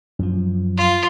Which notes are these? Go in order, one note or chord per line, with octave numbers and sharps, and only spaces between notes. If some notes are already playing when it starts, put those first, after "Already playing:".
F#2 F3
F4